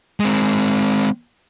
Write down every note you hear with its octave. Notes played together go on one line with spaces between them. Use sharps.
G#3 C4